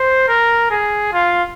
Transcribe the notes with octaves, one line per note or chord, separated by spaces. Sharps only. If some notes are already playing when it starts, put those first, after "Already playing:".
Already playing: C5
A#4
G#4
F4